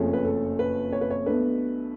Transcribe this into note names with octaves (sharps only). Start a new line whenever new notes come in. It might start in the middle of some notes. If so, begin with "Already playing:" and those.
Already playing: F#1 F2 F3 A3 C#4 G#4
B4
A4
B4
C#5
B4
C#5
B1 B2 A3 D4 B4